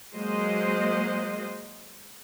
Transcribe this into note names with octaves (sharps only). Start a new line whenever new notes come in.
F#3 G#3 A#3 C5 D#5